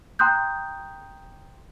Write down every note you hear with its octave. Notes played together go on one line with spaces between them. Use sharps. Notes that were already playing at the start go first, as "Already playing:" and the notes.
G5 A#5 C6 D#6 F#6 G6